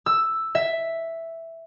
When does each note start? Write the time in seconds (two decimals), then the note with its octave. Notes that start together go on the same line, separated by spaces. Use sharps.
0.06 E6
0.55 E5